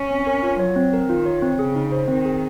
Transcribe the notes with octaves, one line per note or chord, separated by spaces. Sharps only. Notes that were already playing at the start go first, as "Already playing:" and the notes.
Already playing: C#4
C4
A#4
F4
F#3 C#5
C4
A#4
D#3 F4
C#5
C4
C#3 G#4
D#4
C5
D#3 C4
G#4